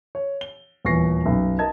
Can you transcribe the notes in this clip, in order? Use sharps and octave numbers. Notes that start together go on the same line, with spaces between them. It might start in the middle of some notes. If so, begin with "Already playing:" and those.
C#5
G7
D#1 E2 E3 C#6 A#6 C7
B1 F#2
A#4 D#5 A5 G#6